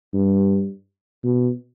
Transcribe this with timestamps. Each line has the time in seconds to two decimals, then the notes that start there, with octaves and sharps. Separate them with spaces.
0.14 G2
1.24 B2